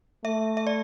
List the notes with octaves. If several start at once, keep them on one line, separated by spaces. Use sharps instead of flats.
A3 E5
E5
D5